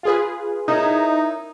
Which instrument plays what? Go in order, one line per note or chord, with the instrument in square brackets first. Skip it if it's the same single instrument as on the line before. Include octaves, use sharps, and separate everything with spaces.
[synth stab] F4 G#4 B4
[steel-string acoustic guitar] C#4 E4 A#4 [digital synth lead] D#4